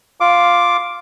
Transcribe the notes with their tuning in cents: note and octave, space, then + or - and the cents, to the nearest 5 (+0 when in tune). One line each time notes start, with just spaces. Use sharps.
F4 +0 F5 +0 D6 +0